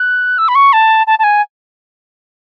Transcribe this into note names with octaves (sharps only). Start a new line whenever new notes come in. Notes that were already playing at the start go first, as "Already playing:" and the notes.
Already playing: F#6
E6
B5
C#6
A5
A5
A5
G#5